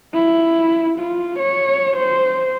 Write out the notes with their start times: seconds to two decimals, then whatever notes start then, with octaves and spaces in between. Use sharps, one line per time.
0.14 E4
0.99 F4
1.39 C#5
1.96 C5